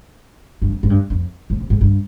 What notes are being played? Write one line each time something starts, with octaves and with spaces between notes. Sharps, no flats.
G2
F2
G#2
G2
F2
G#2
C3
G#2
G2